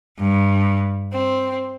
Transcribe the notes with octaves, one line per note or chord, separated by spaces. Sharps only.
G2
C4